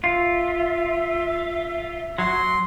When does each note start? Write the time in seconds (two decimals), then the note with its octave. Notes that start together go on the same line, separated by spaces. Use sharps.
0.04 F4 E5
2.18 F#3 C6